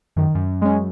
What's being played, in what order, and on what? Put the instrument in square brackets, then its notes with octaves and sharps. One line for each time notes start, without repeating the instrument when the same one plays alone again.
[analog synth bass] F#2 [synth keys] D#3
[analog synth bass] F#2
[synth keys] G#3 C#4